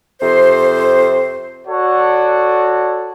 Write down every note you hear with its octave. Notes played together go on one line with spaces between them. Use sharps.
F2 C3 C5
F#4 A4 C#5 D5 F#5